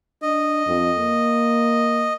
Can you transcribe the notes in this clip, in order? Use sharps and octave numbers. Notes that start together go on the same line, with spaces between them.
D4 D#5
F2
A#3